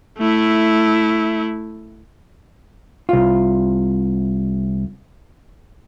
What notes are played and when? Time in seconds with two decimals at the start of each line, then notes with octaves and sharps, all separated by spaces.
0.19 A3 E4
3.09 C2 F4